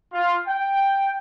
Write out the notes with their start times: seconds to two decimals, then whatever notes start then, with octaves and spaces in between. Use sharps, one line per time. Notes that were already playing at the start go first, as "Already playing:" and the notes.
0.13 F4
0.47 G5